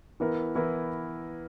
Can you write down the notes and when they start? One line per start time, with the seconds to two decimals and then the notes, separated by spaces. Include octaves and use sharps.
0.20 E3 B3 E4 A#4
0.55 E3 B3 E4 A#4